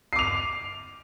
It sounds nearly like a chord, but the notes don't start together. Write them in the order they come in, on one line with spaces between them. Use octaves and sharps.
C7 D6 F7